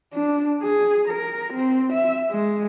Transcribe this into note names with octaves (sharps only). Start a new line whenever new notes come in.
D4
G#4
A#4
C4
E5
G#3